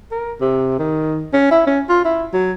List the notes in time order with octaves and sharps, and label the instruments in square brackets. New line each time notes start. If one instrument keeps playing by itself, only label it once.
[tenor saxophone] A#4
C3
D#3
C#4
E4
C#4
F4
E4
F#3